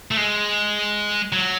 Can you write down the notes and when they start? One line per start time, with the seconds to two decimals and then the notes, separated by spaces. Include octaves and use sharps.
0.11 A3
0.17 G#3
1.32 F#3